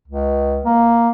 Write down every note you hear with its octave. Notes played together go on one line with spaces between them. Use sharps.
C#2
A#3